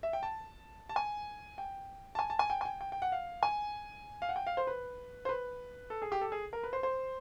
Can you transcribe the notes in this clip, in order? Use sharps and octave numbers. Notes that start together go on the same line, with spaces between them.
E5
G5
A5
A5
G#5
G5
A5
G#5
A5
G#5
G5
G#5
G5
G5
G5
F#5
F5
G#5
F5
F#5
G5
F5
C5
B4
C5
B4
A4
G#4
G4
A4
G#4
A#4
B4
C5
C5